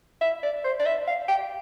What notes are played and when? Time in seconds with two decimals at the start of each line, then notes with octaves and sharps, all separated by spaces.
0.21 E5
0.43 D5
0.64 C5
0.79 D5
0.86 E5
1.07 F5
1.28 G5